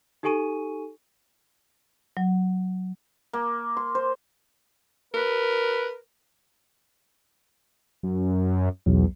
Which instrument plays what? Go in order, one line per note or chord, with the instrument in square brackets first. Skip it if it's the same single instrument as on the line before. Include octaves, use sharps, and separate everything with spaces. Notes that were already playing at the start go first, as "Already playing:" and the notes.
[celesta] D#4 G4 A4 G#5 C#6 D#7
[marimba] F#3
[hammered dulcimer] A#3
C6
C5
[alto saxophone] A#4 [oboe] B4
[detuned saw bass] F#2
[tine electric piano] B1 F#3 [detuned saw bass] E2